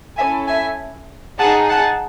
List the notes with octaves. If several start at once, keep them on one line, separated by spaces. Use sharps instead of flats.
C#4 E4 A4 E5 G#5
E5 G#5
D#4 G#4 F#5 A5
F#5 A5